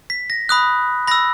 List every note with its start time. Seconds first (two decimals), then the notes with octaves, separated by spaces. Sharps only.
0.10 B6
0.30 A#6
0.49 B5 D#6 F#6
1.08 B5 A#6
1.11 E6